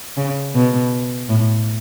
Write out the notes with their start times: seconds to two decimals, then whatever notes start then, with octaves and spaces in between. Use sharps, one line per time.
0.17 C#3
0.55 B2
1.29 A2